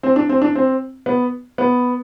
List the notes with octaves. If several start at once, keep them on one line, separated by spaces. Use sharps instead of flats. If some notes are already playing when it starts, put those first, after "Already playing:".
C4
D4
C4
D4
C4
B3
B3